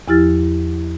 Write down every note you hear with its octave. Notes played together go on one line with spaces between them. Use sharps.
E2 F3 E4 G4 F6 A6